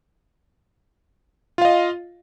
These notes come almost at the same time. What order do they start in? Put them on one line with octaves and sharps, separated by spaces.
F4 F5 D#5